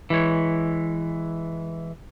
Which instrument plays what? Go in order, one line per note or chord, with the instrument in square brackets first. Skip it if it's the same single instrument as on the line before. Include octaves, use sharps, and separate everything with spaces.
[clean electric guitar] E3 G#3 C#5